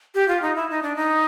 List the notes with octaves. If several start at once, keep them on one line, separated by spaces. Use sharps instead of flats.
G4
F4
D#4
E4
D#4
D4
D#4